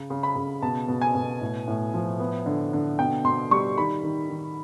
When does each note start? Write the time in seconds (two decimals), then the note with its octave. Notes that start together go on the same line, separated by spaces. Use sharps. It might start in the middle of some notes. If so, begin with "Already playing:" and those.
Already playing: C#3
0.10 C#3
0.23 B5
0.36 C#3
0.62 B2 A5
0.88 B2
1.02 G#5
1.15 B2
1.41 A2
1.68 A2
1.94 F3
2.20 B3
2.46 D3
2.73 D3
2.99 B2 G5
3.24 B2 C6
3.51 G3 C#6
3.78 D#3 B5
4.03 D#3
4.29 D#3